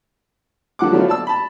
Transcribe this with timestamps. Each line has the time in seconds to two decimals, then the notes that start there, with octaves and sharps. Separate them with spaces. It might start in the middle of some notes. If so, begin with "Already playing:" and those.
0.79 D3 F3 F#5 D6
0.92 F3 F#3 A3 B3 D4 F4
1.08 D5 A5 E6
1.27 A5 B5